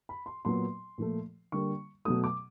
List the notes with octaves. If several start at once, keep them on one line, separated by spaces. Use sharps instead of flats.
B5
C6
A#2 F#3 B3 C6
A#2 F3 A3
D3 G3 A#3 C#6
B2 F#3 A3 D#6
D6